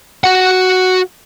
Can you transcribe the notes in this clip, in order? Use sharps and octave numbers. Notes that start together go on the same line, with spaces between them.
F#4 F#5